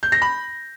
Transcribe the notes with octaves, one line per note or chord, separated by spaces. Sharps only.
G6
A#6
B5